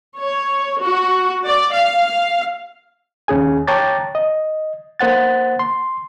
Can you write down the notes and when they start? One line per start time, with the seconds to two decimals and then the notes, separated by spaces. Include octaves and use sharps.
0.18 C#5
0.82 F#4
1.45 D5
1.73 F5
3.28 D#2 C#4 G#4 G#5
3.67 C#5 G5 A5 A#5 D6 A6
4.15 D#5
4.99 A#3 C5 F#5 A6
5.59 C6